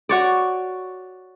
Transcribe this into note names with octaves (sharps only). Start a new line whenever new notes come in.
F#4 C#5 D5